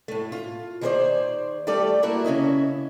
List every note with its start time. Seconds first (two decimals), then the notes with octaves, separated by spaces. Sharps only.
0.08 A2 A3
0.32 F4
0.81 D#3 E4 G#4 A4 C5 D5
1.67 G3 A3 G4 A4 D5
2.03 A3 A#3 E4 F#4
2.24 C#3 C#4 E4 D#5